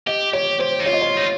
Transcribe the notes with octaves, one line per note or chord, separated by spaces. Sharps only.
G4 D#5
G4 C#5
G4 C5
D#4
F4 C#5
D#5
C#5
D#4